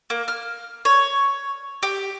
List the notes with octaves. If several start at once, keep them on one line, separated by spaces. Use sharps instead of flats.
A#3
F6
C#5
G4